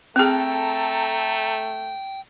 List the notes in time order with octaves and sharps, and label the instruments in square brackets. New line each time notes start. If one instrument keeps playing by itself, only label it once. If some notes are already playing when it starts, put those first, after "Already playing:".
[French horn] A3 [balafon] C4 G#4 [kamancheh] A4 A#5 [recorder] G5